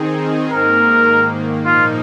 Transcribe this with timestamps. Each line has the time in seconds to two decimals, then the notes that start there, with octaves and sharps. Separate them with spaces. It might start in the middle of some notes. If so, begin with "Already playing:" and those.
Already playing: D#3 C4 D#4 G#4
0.50 G#2 D#3 A#3 A#4
1.65 A#2 F3 A#3 D#4 F4